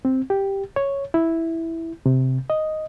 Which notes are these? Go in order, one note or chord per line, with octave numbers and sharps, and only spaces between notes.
C4
G4
C#5
E4
C3
D#5